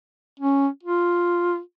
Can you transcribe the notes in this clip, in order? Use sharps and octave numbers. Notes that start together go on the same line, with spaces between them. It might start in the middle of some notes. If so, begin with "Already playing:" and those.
C#4
F4